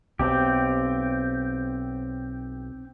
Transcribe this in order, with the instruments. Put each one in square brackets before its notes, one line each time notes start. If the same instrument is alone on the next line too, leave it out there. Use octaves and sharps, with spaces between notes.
[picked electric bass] B1 [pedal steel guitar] C4 G4